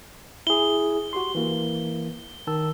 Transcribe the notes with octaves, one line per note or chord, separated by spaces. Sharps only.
E4 G#4 G7
F#4 G4 C6
E3 A#3
D#3 A5 E6